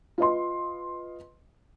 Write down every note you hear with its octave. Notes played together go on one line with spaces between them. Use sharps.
F4 B4 D#5 C6